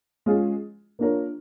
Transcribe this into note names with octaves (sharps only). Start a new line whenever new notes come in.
G#3 C#4 F4 G#4
A#3 D4 F4 A#4 C#5